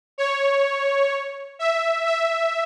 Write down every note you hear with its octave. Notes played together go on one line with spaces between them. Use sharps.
C#5
E5
E5